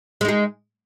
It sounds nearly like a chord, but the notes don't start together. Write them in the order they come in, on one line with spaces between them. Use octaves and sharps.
G#3 D#4 G#4